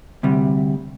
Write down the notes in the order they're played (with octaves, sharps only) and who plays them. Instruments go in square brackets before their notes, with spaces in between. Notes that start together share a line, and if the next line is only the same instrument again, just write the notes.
[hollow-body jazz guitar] D2 C3 G3